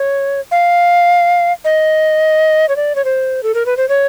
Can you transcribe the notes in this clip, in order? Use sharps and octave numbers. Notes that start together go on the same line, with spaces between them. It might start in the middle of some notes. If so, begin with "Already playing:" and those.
Already playing: C#5
F5
D#5
C#5
D5
C#5
C5
A4
A#4
B4
C5
C#5